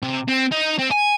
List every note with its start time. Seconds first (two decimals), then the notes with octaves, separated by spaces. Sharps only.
0.03 C3
0.28 C4
0.52 D#4
0.79 C4
0.91 G#5